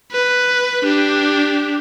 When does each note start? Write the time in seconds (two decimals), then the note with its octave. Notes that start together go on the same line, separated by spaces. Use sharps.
0.12 B4
0.84 D4 G4